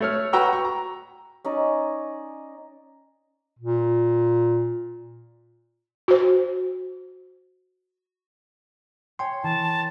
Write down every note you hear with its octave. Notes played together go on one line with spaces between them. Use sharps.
A3 C#5 F6
F#4 B4 G5 A#5 C#6 E6
G5 C#6
A#5
C#4 D#4 D5 D#5
A#2
F#4 C5
C#5 G5 G#5 C6 C#6
E3 A#4 A5